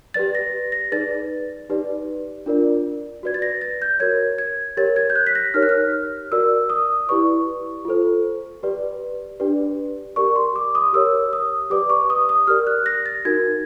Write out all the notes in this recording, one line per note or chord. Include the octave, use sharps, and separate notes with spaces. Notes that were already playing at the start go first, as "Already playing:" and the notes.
G4 B4 D5 A6
A#6
A#6
D#4 G#4 B4 D5 A6
D#4 G4 B4 D5
D4 F4 A#4 D5
F#4 B4 D5 G#6
A6
A#6
A6
G6
F#4 A#4 C#5 G#6
G#6
G4 A#4 C#5 A6
G#6
G6
F#6
B6
A#6
D#4 G4 A#4 C#5 F6
F#6
F6
F#4 A#4 D5 E6
D#6
E4 G4 B4 D5 C#6
F4 A4 C5
G4 B4 D5
D4 G4 B4 D5
G4 A#4 D5 C#6
C6
D6
D#6
G4 A#4 C#5 E6
D#6
G4 B4 D5 D6
C#6
D#6
D#6
G4 A#4 D5 F6
F#6
A#6
A6
D#4 F#4 A#4 G#6